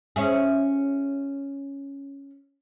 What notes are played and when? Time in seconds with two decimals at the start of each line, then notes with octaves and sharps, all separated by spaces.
0.16 C#4 E4 G#4